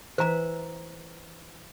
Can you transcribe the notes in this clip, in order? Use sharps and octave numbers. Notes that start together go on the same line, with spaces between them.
E3 C5 E5 A#5